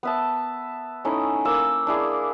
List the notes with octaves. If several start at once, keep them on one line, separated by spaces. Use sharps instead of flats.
B3 E5 A5
A3 C#4 D#4 E4
A#3 E6
D4 E4 G#4